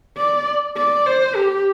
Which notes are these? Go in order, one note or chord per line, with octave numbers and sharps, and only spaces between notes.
D5
D5
C5
G4